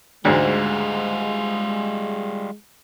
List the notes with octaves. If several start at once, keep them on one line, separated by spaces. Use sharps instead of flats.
D2 G#2 G3 G#3 F4